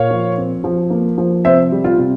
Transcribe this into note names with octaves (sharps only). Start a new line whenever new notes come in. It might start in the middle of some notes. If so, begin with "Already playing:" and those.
Already playing: A#2 C#5 F5
F3
C4
F3
A#3
F3
C3 C5 E5
G3
F4
C3